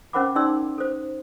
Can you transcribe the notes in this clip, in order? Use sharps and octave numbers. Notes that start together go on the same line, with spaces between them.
C#4 A#4 C5 F#5 B5 D6
C#4 D#4 G#4 D5 C6 E6
A4 C5